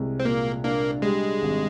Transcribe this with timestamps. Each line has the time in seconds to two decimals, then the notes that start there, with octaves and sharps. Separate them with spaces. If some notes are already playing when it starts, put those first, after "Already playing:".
Already playing: C2 G#3
0.19 C4
0.25 A#2 A#3
0.64 A#3 D4
1.02 G3 G#3
1.42 G#1